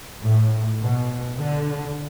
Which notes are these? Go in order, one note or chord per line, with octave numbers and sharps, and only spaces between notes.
A2
B2
D3